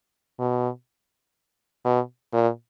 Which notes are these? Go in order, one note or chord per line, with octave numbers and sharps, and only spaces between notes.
B2
B2
A#2